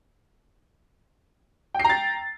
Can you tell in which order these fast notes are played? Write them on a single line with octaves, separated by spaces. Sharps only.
G5 C7 A#5 A6